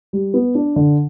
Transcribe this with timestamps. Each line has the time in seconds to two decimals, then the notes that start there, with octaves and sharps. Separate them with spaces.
0.13 G3
0.34 B3
0.55 D4
0.76 D3